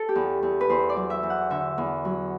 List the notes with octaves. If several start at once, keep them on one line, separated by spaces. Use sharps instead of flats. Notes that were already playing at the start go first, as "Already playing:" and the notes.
Already playing: A4
G4
E2
E2
B4
E2 C5
D5
F#3
E5
E2
F#5
D3 E5
E2
F#3